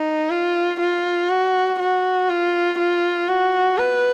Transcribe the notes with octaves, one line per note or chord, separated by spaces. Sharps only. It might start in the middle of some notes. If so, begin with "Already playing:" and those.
Already playing: D#4
F4
F4
F#4
F#4
F4
F4
F#4
B4